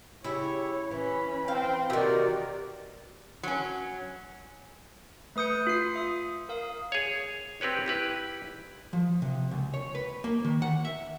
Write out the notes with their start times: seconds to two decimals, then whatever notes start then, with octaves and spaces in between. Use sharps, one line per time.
0.24 C#3 E4 G4 C#5
0.91 E3 C#4 B5
1.48 C4 F5 G5
1.90 C3 D#3 F#4 A#4 D5
3.43 F#3 C#4
5.36 A3 B4 D#6 G6 C#7
5.67 F4 C7
5.95 E5 D#6
6.49 A#4 F5 D#6
6.92 G#4 C#5
7.61 C4 G4 B4 C#5
7.86 E4 G4 B4
8.93 F3
9.22 C3
9.51 C#2
9.74 C#5
9.95 B4
10.24 A#3
10.44 D#3
10.62 F#5
10.85 E5